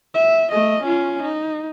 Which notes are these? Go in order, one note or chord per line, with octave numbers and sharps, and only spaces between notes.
E5
A3 D#5
C#4 F4
D#4